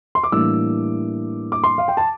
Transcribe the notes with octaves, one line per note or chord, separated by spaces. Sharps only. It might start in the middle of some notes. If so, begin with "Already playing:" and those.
C6
D6
A2 E3 G3 A#3 D4 E6
D6
C6
F5
G5
A5